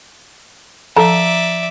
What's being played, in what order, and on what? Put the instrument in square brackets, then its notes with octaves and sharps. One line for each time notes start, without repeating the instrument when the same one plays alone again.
[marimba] F3 [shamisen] A4 [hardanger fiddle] D5 E5 [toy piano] A#5